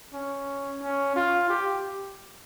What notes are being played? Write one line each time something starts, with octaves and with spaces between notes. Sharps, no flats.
C#4
C#4
F4
G4